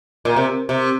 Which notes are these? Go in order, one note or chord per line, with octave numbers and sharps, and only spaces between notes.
A#2
C3
C3